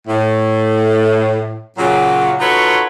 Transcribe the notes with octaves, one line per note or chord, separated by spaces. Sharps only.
A2
A#2 C#3 F#3
D#4 F4 F#4 A4 B4 C#5